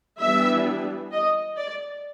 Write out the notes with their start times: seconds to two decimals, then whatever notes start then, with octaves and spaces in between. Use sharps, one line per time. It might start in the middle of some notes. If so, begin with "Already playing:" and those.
0.20 E3 G3 B3 D4 E5
1.12 D#5
1.56 D5